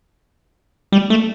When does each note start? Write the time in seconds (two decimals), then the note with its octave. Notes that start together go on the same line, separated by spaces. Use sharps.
0.92 G3
1.10 A3